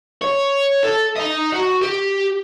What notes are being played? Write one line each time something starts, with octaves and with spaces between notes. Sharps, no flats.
C#5
A4
D#5 A#5
F#4
G4